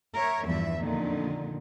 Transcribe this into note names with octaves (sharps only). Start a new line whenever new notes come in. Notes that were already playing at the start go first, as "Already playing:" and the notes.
A#4 C#5 E5
E2 G2 E3 F3 E5
F2 A#2 D3 D#3